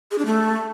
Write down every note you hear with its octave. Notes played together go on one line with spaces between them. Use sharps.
G#4
D4
A3